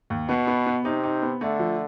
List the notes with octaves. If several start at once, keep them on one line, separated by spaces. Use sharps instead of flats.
D#2
B2 B3
B3
B3
C3 D#4
D#4
B3
D3 A3
F3